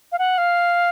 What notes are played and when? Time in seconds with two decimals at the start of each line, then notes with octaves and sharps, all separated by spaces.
0.12 F5
0.19 F#5
0.38 F5